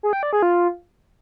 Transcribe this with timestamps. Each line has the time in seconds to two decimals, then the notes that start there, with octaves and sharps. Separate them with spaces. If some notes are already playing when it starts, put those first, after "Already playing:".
0.03 G#4
0.13 G5
0.23 D5
0.33 G#4
0.42 F4